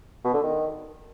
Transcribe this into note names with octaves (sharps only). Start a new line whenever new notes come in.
B2
D3
D#3